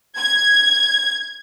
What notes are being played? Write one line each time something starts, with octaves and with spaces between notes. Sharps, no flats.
G#6